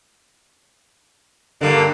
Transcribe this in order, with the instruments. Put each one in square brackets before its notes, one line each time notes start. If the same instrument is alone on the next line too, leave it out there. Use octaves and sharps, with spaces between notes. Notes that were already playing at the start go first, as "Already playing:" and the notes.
[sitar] G2 D3 [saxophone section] A#3